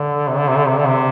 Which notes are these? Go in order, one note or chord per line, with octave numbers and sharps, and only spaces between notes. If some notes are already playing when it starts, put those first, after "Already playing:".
Already playing: D3
C3
D3
C3
D3
C3
D3
C3